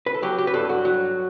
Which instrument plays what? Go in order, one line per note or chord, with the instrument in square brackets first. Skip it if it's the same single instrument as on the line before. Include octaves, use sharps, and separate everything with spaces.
[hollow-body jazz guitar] B4
A4
F#3 G4
G4
B4
G2 A4
F#4
F#3